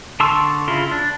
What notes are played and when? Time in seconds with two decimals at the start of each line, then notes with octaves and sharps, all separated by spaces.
0.20 D3 A5 C6 C#6 E6
0.68 C#3 E4 F4 C6
0.91 D4